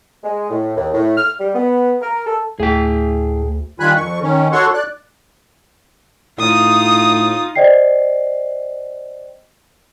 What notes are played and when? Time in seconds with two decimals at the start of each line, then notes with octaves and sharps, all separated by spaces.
0.24 G#3
0.50 A2
0.76 D#2
0.93 A2
1.17 F6
1.40 G3
1.54 B3
2.01 A#4
2.27 A4
2.60 D2 A2 A3 G#4 G5
3.80 D#3 G3 F4 G#5 B5 F#6
3.96 F2 C#6
4.22 D#3 C#4
4.52 F#4 A4 C#5 F#5 C6 C#6
4.74 D5 F#6
6.39 A2 D#4 F4 D#6
7.55 C5 D5 D#5 G5 C7